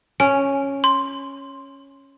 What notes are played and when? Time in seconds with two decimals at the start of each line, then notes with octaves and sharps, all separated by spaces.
0.20 C#4 G#5
0.84 C6